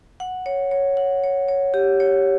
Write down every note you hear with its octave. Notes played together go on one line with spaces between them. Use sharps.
F#5
C#5
C#5
F#5
C#5
C#5
G4
C#5